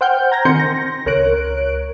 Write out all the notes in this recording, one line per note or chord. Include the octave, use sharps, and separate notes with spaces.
C5 F#5 G5 F6 G6
A#5 G#6 A#6
D#3 C4 G#5 C6 G6 C#7
A#6
C#2 A#4 C#5 F#6 D7